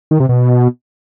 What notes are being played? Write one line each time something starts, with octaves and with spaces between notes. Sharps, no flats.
D#3
C3
B2